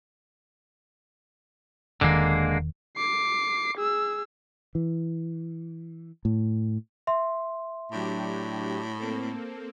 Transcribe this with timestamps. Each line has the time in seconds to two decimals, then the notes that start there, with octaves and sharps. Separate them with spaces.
2.01 E1 D3 D#3 G#3 A#3
2.97 D6 C7
3.78 G#4 E6
4.75 E3
6.25 A2
7.07 E5 C6
7.92 A2 F#3 D4 G4
8.98 A#3 C4 A4